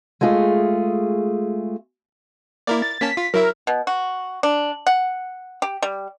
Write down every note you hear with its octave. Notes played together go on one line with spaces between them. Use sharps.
G#3 A3 F4 G#4
A#3 E4 A#4 D5
A6
A#3 C#4 A5 B6
F4
F#3 E4 A#4 E5
B2
F#4
D4
F#5
G4
G3